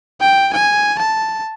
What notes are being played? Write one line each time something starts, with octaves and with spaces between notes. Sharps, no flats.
G5
G#5
A5